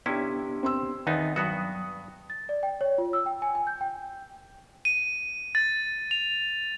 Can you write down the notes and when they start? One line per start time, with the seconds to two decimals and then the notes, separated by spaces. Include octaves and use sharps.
0.06 C3 B3 C#4 D4 E4 G4
0.63 C4 C6 E6
1.07 E2 D#3 B3 D#4 A6
1.36 G2 F#3 B3 F#4 D#6
2.30 A6
2.49 D5
2.63 G5
2.81 C#5
2.98 F4
3.13 E6
3.26 G5
3.42 G#5
3.55 G#5
3.67 G6
3.81 G5
4.85 D#7
5.55 A6
6.11 F7